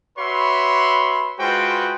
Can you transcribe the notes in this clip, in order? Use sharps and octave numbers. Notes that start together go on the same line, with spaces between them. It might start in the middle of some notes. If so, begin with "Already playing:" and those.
F#4 B4 C#5 E5 B5 C6
G#3 F4 F#4 B4 C5 G5